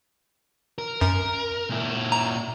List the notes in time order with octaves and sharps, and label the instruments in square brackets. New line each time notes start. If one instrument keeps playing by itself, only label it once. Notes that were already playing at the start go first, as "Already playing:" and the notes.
[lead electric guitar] A#4
[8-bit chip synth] F#2 [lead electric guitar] A#4
[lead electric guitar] A#2 E4
[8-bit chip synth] A#5